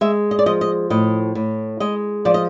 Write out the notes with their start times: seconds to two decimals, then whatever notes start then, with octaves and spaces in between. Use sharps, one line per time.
0.01 G#3 E5
0.31 D#5
0.39 D5
0.46 F3 D#5
0.61 D#5
0.90 A2 D#5
1.35 A2
1.80 G#3 D#5
2.25 F3 D5
2.34 D#5